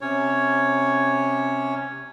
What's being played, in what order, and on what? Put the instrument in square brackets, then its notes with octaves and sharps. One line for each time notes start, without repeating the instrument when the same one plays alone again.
[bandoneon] C3 C#4 C#5